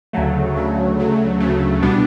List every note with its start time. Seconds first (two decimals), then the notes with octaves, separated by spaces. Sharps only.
0.13 D2 C#3 F#3 A3
0.55 D2 C#3 F#3 A3
0.97 D2 C#3 F#3 A3
1.40 D2 C#3 F#3 A3
1.82 C2 B2 G3 B3 D4